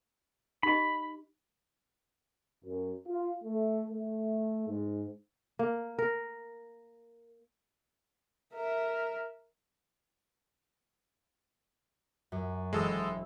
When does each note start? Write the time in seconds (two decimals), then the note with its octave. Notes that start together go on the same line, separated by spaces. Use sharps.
0.63 D#4 G4 D#5 B5
2.64 F#2
3.08 F4
3.43 A3
3.89 A3
4.67 G#2
5.59 A#3
5.99 A#4
8.53 A#4 E5
12.32 F#2
12.73 E1 G#3 A4 D#6 E6